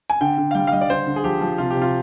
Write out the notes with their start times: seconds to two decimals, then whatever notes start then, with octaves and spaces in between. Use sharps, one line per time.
0.10 G#5
0.21 D3 G5
0.38 D3
0.51 F5
0.55 G3 G5
0.67 F5
0.72 G3 D#5
0.81 D5
0.90 D3 C5
1.07 D3
1.16 G#4
1.24 F3 G4
1.41 F3
1.58 C3 F4
1.70 G4
1.76 C3
1.82 F4